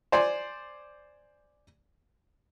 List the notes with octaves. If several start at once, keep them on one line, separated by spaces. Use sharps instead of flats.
C5 D5 G#5